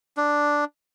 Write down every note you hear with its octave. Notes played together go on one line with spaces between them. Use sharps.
D4